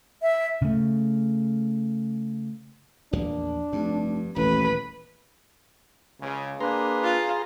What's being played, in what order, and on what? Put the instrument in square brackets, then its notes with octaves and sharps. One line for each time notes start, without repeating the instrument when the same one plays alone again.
[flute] E5
[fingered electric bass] C#3 A3
[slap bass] A#1 E2 A#3 [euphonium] D4
[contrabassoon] F1 [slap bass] G2
[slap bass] D#1 [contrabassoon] A1 [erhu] B4
[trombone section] C#2 C#3
[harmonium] A#3 D4 [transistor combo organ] G#4 A#5 C6 [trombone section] B4
[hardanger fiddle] F4